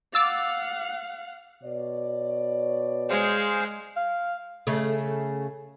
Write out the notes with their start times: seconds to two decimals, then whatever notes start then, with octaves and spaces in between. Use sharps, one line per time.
0.14 F5 F#5 D6 E6 A6
1.63 B2 C#5 D5
3.10 G#3 G#4 C5 F5
3.97 F5
4.67 C#3 A3